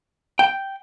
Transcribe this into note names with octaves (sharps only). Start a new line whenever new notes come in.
G5